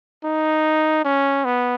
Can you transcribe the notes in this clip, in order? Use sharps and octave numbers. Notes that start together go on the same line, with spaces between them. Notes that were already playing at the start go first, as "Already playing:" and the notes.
D#4
C#4
B3